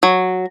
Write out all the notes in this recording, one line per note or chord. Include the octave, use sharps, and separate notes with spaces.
F#3